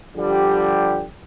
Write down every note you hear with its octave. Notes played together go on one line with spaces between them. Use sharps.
D3 F3 G3 G4